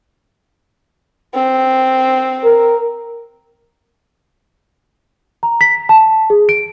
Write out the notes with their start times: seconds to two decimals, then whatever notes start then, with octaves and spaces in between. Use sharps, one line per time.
1.35 C4
2.44 A#4
5.43 A#5
5.61 B6
5.89 A5
6.30 G#4
6.49 D7